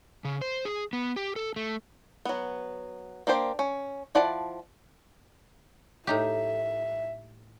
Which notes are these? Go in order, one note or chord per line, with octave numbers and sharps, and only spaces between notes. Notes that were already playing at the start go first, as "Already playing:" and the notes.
C#3
C5
G#4
B3
G4
A4
A3
F#3 B3
A#3 D4 G4 C5
C#4
F3 E4 D5 F#5 A5
A2 D#4 G4 E5